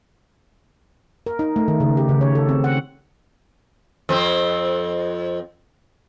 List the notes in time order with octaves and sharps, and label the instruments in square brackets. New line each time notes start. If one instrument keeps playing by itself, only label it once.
[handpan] A#4
D#4
A3
D#3
C#3
G4
C#3
C#5
A4
C4
F#5
[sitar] F2 C4